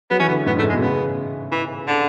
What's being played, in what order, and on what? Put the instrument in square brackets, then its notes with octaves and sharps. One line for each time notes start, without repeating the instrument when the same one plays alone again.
[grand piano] F#3 [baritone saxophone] B3
[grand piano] E3 [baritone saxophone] C#4
[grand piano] D3 [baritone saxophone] B3
[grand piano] A2 [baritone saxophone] B3
[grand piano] G#2
[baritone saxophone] A3
[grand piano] A2
[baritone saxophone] G#3
[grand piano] B2
[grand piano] C#3 [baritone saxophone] B3
[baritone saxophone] E3
D3